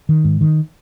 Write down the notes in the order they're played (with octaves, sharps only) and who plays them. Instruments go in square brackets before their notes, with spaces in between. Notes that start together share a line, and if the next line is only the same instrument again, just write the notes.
[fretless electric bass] D#3
G#2
D#3